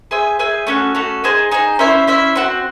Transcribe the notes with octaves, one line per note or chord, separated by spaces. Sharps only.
G#4 C5 E5 G#5
G#4 C5 E5 G#5
A3 C#4 F#4 A4
A3 C#4 F#4 A4
D#4 G#4 C5
D#4 G#4 C5
C#4 E4 C5 E5
C#4 E4 C5 E5
C4 F#4 C5